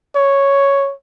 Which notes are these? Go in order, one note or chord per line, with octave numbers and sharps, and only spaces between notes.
C#5